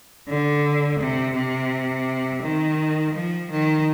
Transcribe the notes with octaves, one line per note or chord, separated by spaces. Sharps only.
D3
C3
C3
D#3
F3
D#3